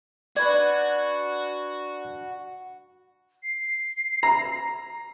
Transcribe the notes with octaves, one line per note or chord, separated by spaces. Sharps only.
D4 F#4 B4 D5 G#5
C7
A#5